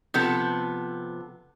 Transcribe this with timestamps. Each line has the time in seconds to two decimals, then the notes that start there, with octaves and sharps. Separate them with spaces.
0.14 C3 F3 B3 A4